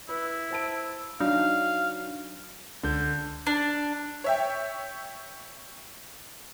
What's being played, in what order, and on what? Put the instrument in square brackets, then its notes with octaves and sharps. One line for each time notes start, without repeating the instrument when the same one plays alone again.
[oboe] E4 [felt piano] B4
[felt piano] C5 A5 D7
[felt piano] F#3 D#4 [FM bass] D4 [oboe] F5
[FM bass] C#2 [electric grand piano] D3 G6
[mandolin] D4
[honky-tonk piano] C#5 E5 G5